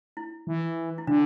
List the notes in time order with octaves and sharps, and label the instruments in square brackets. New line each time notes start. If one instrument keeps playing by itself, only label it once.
[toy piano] E4
[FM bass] E3
[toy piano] E4
[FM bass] D3 [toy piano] D4